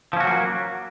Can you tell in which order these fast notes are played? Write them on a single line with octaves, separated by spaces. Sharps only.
F3 C#4 F#4 F#3 A#3